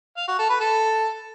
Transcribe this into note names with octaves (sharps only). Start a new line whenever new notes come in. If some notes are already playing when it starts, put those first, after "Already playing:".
F5
F#4
A4
B4
A4